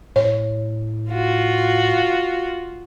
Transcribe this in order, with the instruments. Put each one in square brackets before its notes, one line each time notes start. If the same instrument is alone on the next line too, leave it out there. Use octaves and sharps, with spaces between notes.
[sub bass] A2 [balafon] C#5
[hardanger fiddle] F4 F#4